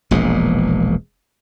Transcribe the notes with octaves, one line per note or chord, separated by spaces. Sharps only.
E1 A#1 A#2 G#3